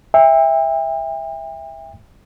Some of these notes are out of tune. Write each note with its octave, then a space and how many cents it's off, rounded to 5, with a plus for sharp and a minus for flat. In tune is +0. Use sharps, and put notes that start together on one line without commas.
E5 -5 G5 +35